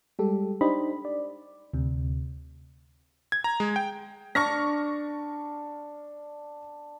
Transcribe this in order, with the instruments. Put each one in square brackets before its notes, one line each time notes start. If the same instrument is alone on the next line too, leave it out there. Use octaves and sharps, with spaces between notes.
[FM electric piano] G3 G#3 G4 A4
D4 D#4 G4 C5 D#5 B5
D5
D2 C3
[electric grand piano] G#6
A#5
G#3
G5
[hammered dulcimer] D4 [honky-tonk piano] C#6 F6 A#6